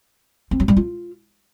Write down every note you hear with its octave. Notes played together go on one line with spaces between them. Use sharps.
C4
F#3
G3
F4